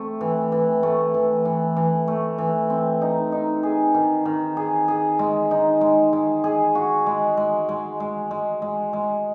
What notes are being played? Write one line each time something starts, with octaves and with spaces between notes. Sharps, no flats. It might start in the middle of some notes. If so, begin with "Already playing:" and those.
Already playing: A3 C4
E3
E3
A3
E3
E3
E3
A3
E3
C4
D#4
D#4
G#4
D#3
D#3
G#4
G#4
G#3
D#4
G#3
G#3
G#4
F#4
G#3
G#3
G#3
G#3
G#3
G#3
G#3